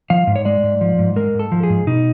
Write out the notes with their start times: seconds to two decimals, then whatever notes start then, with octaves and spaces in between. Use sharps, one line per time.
0.10 F3 F5
0.27 G#2
0.36 C#5
0.45 G#3 D5
0.63 G#2
0.81 F3
0.99 G#2
1.16 G#3 A#4
1.35 G#2 A4
1.52 F3
1.63 G#4
1.70 G#2
1.87 B2 D#4